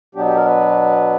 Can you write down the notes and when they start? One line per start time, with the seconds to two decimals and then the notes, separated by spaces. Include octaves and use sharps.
0.15 B2 F#3 B3 D4 G4
0.25 G4
0.35 A#4
0.46 B4